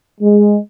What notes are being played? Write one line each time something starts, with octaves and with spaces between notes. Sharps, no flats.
G#3